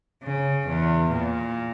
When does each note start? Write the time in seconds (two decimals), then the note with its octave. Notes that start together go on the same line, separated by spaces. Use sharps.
0.24 C#3
0.68 E2
1.12 A#2